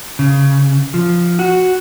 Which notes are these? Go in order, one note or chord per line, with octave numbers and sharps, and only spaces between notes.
C#3
F3
F#4